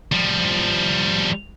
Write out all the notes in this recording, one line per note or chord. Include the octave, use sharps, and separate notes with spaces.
F3 G3